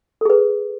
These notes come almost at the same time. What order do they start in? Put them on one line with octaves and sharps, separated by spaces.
A4 G#4 B4